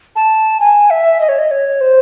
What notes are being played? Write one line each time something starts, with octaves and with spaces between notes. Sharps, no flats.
A5
G#5
E5
D#5
C#5
D#5
C#5
C5